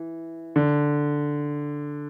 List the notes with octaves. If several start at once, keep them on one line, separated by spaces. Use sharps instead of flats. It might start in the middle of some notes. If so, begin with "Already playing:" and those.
Already playing: E3
D3